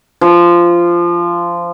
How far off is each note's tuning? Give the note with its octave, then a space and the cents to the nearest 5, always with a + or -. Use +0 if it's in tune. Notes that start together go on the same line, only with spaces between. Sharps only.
F3 -15